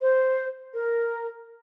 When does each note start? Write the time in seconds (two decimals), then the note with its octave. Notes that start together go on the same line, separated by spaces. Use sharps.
0.01 C5
0.73 A#4